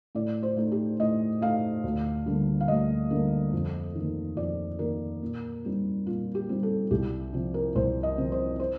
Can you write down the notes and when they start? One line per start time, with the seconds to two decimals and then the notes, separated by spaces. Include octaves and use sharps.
0.15 A2 D5
0.43 C5
0.57 A3 D#4
0.72 G4
1.00 A2 D#5
1.41 A3 D#4 F5
1.84 D2
2.26 D3 G3 A#3
2.60 F5
2.68 D2 D#5
3.10 D3 G3 A#3
3.53 F2
3.95 D#3 A#3
4.37 F2 D5
4.79 D#3 A#3 A#4
5.22 A#2
5.65 G3 C4 D#4
6.06 A#2 F4
6.35 G4
6.49 G3 C4 D#4
6.63 A4
6.91 C2 G4
7.33 C3 F3 C4
7.54 A#4
7.75 C2 C5
8.03 D#5
8.18 C3 F3 C4
8.32 C5
8.60 C5